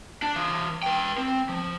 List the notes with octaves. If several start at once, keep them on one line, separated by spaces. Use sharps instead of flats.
D4
E3 F5
B4 G5
C4
F3